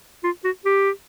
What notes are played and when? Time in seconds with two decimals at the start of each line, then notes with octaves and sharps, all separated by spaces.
0.24 F4
0.44 F#4
0.65 G4